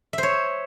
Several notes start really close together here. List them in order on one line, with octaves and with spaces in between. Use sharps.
E5 C5 C#5